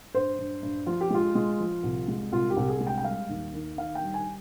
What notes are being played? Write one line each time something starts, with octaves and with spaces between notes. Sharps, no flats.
G2 C5
G2
G2
F3 F4
G4
G#3 F4
G#3
F3
C2
G#3
C2 F4
G4
C2
G#4
G#3
G5
G5
G3 F5
D#2
D#3
D#3 F5
G5
G3
G#5